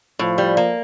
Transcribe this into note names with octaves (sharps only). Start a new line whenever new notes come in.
A2 F3
G3
A#3